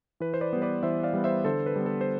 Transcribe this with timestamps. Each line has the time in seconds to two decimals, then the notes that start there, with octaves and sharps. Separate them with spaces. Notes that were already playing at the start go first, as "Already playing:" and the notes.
0.20 E3 B4
0.34 C5
0.41 B4 D5
0.53 G3 B3
0.62 B4 D5
0.83 E3 C5 E5
1.03 D5 F5
1.14 G3 B3
1.24 C5 E5
1.45 D3 A4 C5
1.66 B4
1.76 G3 B3
1.86 A4
2.01 C5